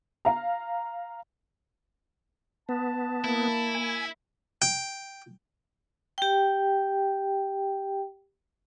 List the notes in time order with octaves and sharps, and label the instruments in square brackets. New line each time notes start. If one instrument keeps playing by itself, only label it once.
[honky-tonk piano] F5 A#5
[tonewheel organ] B3 [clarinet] A5
[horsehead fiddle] A#3 [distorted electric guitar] E4
[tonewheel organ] G#5
[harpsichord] G5
[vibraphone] G4 G5